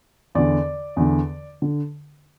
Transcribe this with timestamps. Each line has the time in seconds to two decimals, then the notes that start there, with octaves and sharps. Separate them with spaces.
0.35 E2 D3 D5
0.97 E2 D3
1.62 D3